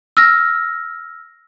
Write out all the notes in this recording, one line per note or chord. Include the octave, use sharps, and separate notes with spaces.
E6 F6 A#6